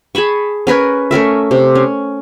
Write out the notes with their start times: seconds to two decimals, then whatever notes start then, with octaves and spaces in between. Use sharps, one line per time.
0.15 G#4 A5 B5 C#6
0.67 C#4 A#4 B4 C#5
1.11 A3 C#4 A#4 E5
1.51 C3
1.75 C#4